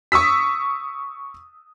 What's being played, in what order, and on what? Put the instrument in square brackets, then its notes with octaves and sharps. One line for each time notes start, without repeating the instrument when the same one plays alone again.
[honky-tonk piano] C#6 D#6 E6 B6